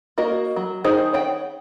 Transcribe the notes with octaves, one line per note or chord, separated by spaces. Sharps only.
A#3 F#4 A#4 D#5
F#3
D#3 D#4 G#4 C5 D#5
C#5 F#5 G5